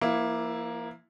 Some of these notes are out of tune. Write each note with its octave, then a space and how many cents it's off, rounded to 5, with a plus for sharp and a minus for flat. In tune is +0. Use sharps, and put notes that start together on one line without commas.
F3 -35 A#3 +10 E4 +5